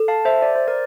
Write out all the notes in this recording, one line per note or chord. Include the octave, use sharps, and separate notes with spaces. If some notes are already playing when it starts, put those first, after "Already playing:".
Already playing: A4
F5 A5
C5 E5
D5
C5
A#4 D5